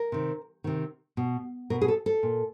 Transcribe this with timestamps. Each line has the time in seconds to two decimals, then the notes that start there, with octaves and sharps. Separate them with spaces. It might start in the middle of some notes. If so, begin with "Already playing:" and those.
Already playing: A#4
0.12 C3 D#3
0.64 C3 D#3
1.17 B2
1.70 B2 A#4
1.81 G#4
1.88 A4
2.06 A4
2.23 A#2